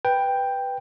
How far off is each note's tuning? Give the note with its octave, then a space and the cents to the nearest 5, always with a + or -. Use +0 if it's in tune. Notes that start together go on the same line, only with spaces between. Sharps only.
B4 +0 G5 +5